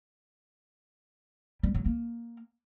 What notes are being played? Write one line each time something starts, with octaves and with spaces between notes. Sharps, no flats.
G3
F#3
A#3